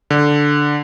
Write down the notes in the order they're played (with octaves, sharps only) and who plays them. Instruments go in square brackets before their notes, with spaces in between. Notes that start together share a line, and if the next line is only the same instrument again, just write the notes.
[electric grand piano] D3